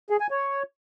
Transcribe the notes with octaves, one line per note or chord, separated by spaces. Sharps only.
G#4
G#5
C#5